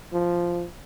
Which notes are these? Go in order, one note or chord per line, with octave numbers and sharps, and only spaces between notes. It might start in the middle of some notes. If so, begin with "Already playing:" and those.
F3